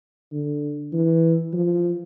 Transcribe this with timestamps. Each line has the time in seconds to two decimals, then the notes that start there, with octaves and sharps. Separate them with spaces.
0.32 D3
0.93 E3
1.53 F3